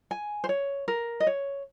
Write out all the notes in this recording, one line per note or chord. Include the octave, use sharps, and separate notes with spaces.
G#5
C5
C#5
A#4
D#5
C#5